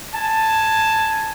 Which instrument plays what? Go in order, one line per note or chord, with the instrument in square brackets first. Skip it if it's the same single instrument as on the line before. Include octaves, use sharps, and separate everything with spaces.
[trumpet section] G#5 A5